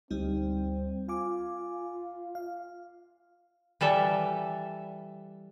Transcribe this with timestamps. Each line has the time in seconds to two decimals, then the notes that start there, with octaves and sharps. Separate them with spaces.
0.11 D2 G3 C4 D#4
1.09 F4 F5 G#5 D6
2.35 F5
3.81 E3 G3 A4 E5